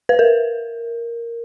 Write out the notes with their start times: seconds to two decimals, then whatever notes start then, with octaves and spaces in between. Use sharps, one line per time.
0.09 B4
0.19 A#4